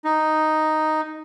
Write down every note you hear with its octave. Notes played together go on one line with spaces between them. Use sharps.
D#4